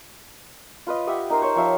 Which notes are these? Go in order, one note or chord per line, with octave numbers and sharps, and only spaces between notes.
F4 B4 D#5
G4 E5 F#5 D#6
D#4 A#4 C5
C5 C#5 G5
F3 C#5 E5 F5